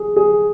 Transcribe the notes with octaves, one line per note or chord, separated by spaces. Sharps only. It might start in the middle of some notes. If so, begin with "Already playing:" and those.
Already playing: G#4
G#4